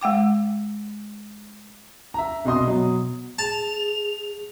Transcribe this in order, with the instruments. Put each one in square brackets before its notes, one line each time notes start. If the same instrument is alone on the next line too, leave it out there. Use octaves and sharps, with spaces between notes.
[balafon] G#3 F#5 G5 D6
[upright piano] E5 A#5
C2 B2 D#5 C6 D#6
B2 F#3
[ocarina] G#4 [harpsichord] A5 [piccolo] F7